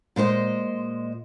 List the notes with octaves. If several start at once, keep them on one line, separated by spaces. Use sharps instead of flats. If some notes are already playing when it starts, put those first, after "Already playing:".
A#2 G#3 C5 D#5